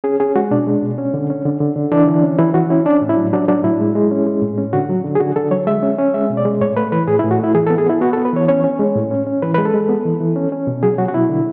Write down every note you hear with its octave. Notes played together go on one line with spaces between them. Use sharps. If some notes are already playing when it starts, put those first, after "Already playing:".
C#4 G#4
C#4 G#4
G#3 F#4
B2 D4
G#3
B2
C#4
D3
C#4
D3
D3
D3
E3 D4
E3
C#4
E3 E4
E3 F#4
C#4 E4
C#4 D4
A2
E4
F#3
F#3 D4
F#3 D4
A2 E4
G#3
G#3
C#4
G#3
A2
C#4
D3 F#4
F#3
D3
G#4
D3 F#4
D3 A4
F#3 C#5
G#3 E5
C#4
C#4
G#3 E5
B2
D5
G#3
A2 C#5
A3 B4
E3 B4
A2 G#4
E4
A2
F#4
A3 E4
E3 G#4
A4
B3
G#4
B3 E4
B3 F#4
A4
B3
B4
E3 C#5
C#4 C#5
C#4
G#3
A2
C#4
C#4
E3 B4
G#3 B4
A4
G#3
B3
E3
E3
C#4
C#4
B2
F#3 G#4
F#3 F#4
F#4
B2 E4
D3